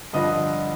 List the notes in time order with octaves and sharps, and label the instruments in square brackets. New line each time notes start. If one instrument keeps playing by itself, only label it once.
[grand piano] G2 D3 F3 D#5